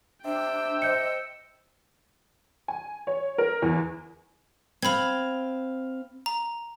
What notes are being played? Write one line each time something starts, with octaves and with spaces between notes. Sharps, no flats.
C3 D4 G5 E6
C5 D#5 G6 C#7
G#5
C#5
A#4
E2
C4 F5 B5 G#6
A#5